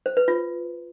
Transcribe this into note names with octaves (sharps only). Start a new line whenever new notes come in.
C5
B4
F4